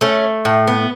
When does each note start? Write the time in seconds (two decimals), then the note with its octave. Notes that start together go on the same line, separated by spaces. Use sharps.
0.01 A3 C#4
0.45 A2
0.67 B3